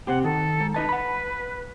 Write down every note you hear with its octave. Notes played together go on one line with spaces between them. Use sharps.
C3 C4 G4 F#5
D#3 A4
G#2
D#4 B4 D#5 A5
F#5 B5